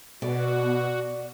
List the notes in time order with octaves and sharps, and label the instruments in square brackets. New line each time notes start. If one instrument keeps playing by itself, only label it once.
[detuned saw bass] B2 [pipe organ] F#4 [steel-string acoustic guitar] D5